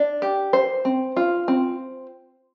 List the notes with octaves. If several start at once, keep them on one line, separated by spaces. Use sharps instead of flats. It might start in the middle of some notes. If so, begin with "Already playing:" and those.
Already playing: D4
G4
C5
C4
F4
C4